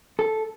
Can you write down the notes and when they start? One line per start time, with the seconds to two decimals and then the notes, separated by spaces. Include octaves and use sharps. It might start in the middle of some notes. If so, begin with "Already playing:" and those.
0.19 A4